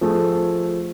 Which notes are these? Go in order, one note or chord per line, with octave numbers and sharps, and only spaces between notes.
F3 A3 G#4